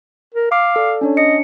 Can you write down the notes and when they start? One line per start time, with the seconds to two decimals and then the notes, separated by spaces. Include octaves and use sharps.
0.35 A#4
0.52 F5 D6
0.76 A4 D5
1.01 C#4 D4 C#5
1.17 D#5 C#7